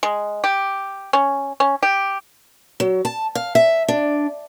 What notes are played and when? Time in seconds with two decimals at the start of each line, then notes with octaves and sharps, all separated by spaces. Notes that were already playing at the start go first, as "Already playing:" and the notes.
0.03 G#3
0.44 G4
1.13 C#4
1.60 C#4
1.83 G4
2.80 F#3
3.05 A5
3.35 F5
3.55 E5
3.88 D4